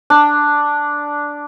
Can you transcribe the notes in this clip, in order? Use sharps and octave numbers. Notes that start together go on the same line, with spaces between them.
D4